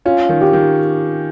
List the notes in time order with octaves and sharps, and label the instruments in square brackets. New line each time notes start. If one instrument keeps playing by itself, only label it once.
[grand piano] C#4 [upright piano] F4
[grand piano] D#3
[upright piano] G4
[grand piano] D#3